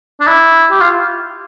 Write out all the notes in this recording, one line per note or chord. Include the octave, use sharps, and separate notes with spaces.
D4
E4
G4
F4